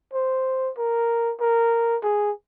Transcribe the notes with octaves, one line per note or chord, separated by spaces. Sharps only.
C5
A#4
A#4
G#4